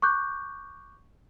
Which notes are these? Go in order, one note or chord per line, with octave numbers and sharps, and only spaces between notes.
C#6 D6 F#6 G6